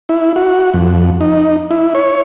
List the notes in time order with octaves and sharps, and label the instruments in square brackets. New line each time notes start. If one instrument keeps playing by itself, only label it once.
[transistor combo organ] E4
F#4
F2
D#4
E4
C#5